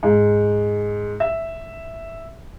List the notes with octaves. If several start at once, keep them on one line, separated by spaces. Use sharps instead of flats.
G#2
E5